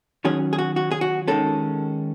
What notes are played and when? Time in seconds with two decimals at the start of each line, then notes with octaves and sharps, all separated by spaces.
0.25 D#3 F#3 C#4 G#4
0.53 G#4
0.58 F#4
0.76 F#4
0.91 G#4
1.01 F#4
1.28 D#3 G#3 C#4 A4